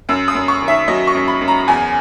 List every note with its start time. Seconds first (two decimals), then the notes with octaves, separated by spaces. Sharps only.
0.09 F#2 E6
0.28 D#6
0.35 F#2
0.48 C#6
0.62 D#3
0.68 E5
0.88 F#3 D#5
1.07 C#6
1.15 F#2
1.28 B5
1.41 F#2
1.48 A#5
1.68 E2 G#5